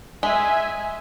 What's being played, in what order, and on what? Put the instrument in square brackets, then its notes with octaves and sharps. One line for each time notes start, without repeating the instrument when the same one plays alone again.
[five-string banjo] G#3 [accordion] E5 G#5